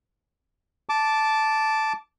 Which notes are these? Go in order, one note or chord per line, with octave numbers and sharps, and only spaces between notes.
A5 D6